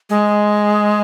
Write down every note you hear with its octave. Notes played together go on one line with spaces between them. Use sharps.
G#3